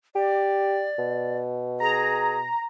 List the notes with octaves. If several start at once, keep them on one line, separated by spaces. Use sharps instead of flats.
G4 D5
B2
G#4 A#5